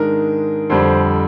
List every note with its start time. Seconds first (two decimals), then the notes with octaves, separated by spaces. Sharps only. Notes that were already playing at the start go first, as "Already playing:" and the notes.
Already playing: G#2 D#3 G#3 D4 A#4
0.70 F2 D3 G3 C5